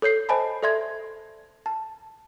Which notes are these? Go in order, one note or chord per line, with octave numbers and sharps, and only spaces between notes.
A4 C#5 G6 C7
C5 D#5 G#5 A5 B5
A4 D5 E5 C6 G#6
A5